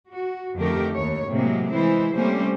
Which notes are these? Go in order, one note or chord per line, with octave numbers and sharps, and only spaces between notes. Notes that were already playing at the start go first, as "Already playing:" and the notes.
F#4
F2 D3 D#3 A3 G4 A#4
D#2 C#5
A2 C3 F#3 G#3 A#3
E3 G#3 E4 C5
C3 G3 A3 A#3 C#4 C5